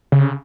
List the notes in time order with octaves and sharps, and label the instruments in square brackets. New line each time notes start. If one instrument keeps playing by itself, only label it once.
[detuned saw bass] C#3